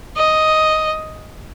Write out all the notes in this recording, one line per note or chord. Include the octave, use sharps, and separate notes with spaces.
D#5